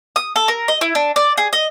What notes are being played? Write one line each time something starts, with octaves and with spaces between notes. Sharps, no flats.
D#6
A4
A#4
D#5
E4
D4
D5
G#4
D#5